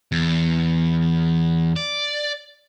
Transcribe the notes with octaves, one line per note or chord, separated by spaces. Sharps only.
E2
D5